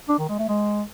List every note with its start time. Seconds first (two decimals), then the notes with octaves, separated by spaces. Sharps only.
0.09 D4
0.19 D#3
0.29 G#3
0.39 A3
0.49 G#3